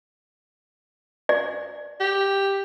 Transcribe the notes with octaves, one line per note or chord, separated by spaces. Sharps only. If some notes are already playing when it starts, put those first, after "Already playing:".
D5
G4